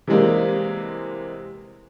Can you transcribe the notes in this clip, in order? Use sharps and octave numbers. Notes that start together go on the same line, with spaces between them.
C3 E3 G3 G#3 A#3 C4